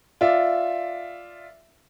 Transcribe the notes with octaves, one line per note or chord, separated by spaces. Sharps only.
F4 D5 E5